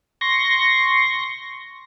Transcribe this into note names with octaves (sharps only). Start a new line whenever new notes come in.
C6 C#6 A#6